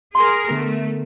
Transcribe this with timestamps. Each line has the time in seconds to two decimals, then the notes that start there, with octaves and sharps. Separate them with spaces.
0.15 G#4 A#4 C6
0.49 D3 A3 B3 A#4